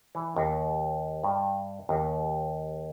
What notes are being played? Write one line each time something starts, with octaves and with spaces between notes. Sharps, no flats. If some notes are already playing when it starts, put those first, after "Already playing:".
E3
D#2
G2
D#2